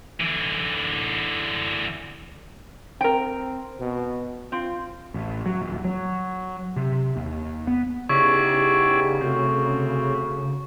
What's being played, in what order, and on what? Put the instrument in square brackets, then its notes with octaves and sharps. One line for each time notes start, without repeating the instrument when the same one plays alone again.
[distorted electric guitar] D3 E3
[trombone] C4 [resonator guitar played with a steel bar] A#4 G5
[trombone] B2
[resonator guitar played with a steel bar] C4 [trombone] F4
[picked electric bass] A1
F#3
D#1
F#3
C3
D#2
B3
[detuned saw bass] C#3 [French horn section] B3 D#4 G4 [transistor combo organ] E4 G#4 D5 [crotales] C#6
[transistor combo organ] C3 [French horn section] A3 F#4